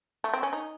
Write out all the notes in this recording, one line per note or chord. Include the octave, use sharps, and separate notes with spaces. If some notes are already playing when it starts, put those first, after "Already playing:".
A3
C4
C#4
D#4